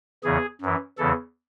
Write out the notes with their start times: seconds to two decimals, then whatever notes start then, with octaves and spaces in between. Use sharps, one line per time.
0.24 E2 C#3 E3 G#4
0.61 F#2 E3
0.98 E2 C#3 E3 A4